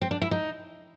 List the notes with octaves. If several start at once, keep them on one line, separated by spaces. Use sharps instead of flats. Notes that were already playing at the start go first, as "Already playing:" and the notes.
C4
D4
E4
D#4